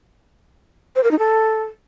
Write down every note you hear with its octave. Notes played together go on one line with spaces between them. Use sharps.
C5
A#4
D#4
A4